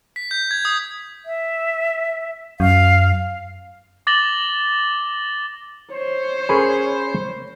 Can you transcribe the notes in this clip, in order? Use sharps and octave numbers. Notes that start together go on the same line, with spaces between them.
B6
G6
G#6
D#6
E5
F#2 F5
D6 A6 A#6 F#7 G7
C5 C#5
C#4 G#4 A#4 B5 C#6